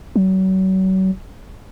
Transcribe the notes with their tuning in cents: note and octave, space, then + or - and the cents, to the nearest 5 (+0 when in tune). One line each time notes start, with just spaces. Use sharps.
F#3 +35